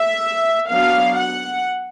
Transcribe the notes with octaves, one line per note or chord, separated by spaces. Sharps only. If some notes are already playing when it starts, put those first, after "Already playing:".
Already playing: E5
F#3 B3 D4 F5
F#5